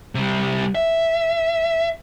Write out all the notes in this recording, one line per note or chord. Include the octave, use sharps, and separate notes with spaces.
C3 G3
E5